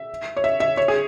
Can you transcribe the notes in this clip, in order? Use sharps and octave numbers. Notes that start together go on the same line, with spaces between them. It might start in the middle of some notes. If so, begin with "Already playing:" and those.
Already playing: E5
C#5
E5
E5
C#5
G#4